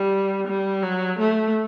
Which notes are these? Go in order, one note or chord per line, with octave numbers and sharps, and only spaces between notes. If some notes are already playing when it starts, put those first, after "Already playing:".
Already playing: G3
G3
F#3
A3